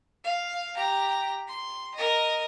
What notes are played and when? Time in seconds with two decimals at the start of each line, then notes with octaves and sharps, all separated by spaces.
0.24 F5
0.77 G4 A#5
1.48 C6
1.95 A#4 D#5